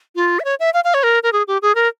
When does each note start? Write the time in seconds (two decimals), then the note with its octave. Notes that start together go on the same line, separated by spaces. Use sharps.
0.16 F4
0.40 E5
0.45 C#5
0.60 E5
0.74 F5
0.84 F5
0.94 C#5
1.03 A#4
1.23 A#4
1.33 G#4
1.48 G4
1.62 G#4
1.75 A#4